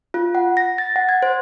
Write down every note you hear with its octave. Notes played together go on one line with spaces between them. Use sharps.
F4
F#5
A#6
A6
F#5
G#6
C5